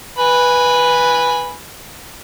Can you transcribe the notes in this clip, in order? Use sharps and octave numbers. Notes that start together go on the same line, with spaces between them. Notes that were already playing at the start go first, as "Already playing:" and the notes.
B4 G#5 B5